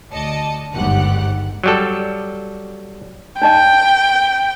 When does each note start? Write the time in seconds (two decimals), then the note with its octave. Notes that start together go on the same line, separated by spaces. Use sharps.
0.12 D2 D5 D#5 A5 C#7
0.73 G1 D#2 G#2 G4 F#5 F#6
1.63 F#3 G3 A4
3.42 D4 D#4 D#5 G5